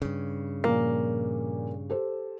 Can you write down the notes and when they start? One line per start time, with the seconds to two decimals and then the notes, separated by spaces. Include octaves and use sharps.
0.02 G2 C#3
0.64 A#2 F3 A#3
1.90 G4 A4 C5